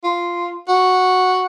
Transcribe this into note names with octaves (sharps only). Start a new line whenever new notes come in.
F4
F#4